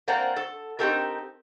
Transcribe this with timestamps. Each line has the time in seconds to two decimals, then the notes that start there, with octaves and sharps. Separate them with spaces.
0.08 A#3 C4 C5 D5 F#5 A#5
0.36 A4
0.79 C4 D#4 F4 G4 A4 A#4